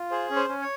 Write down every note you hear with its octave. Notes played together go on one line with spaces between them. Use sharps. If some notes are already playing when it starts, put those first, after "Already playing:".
Already playing: F4
G#4 C5
C#4
C5
C#4
C#5